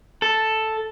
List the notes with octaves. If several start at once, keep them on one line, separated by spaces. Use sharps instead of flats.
A4